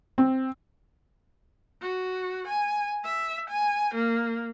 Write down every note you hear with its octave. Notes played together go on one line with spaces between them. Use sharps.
C4
F#4
G#5
E5
G#5
A#3